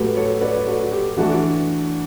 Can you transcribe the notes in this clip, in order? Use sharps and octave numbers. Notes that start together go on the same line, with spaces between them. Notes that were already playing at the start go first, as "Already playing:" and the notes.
Already playing: A2 F#3 A3 F#4 G4 A4 B4
A4 C#5
B4 D5
F#4 A4
G4
E3 A3 D4 F#4